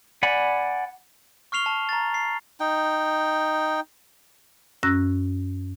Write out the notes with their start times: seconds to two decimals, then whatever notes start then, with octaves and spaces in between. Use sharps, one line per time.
0.23 D5 F#5 G#5 B5
1.52 C#6 F6 C7 F7 G7
1.66 A5
1.89 A#5 A6
2.14 C7
2.60 D#4 G5
4.83 F#2 C#4 E6 F#6 A#6